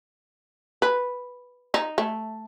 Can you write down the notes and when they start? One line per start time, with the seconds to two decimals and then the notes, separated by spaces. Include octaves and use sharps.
0.82 B4
1.74 D#4
1.98 A3